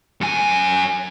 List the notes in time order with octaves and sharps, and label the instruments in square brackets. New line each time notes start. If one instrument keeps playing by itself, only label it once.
[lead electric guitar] F#2 G#5